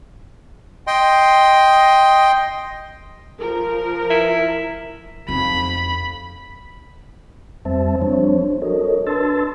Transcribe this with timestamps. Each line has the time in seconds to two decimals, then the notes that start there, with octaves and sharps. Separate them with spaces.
0.87 D#5 G5 C6
3.39 F3 A#4
4.10 E4
5.28 F2 D#4 B5
7.65 F2 G3 C4 C5 E5 A5
8.02 F3 G3 C4 D4 C5 C#5
8.44 D4
8.62 F#4 A4 A#4 C#5 D#5
9.07 D4 B4 A5 C6 E6 A6